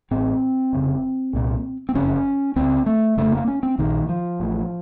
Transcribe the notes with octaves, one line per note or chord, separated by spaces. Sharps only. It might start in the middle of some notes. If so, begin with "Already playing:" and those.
A1 A2 C4
F1 D#2 C#3
C2 A#2
C4
F#1 F2 C#3 C#4
C#2 C#3 C4
A3
F1 F2 C#3 A3
A#3
C#4
C4
A#1 A#2 D#3
F3
A1 A2